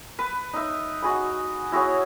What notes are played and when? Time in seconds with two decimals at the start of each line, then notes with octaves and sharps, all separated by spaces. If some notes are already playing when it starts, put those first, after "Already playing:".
0.19 B4
0.53 D#4 E5
1.02 D#4 F#4 G#4 B5
1.72 E4 F#4 G#4 C#5